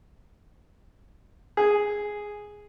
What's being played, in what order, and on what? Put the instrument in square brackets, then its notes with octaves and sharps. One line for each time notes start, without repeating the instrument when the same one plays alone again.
[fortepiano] G#4